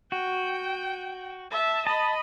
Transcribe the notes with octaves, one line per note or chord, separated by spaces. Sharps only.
F#4 G5
E5 A5
D#5 A5 B5